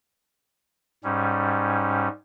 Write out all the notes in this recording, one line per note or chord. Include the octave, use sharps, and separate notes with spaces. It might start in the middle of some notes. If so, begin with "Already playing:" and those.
G#2 G3 C#4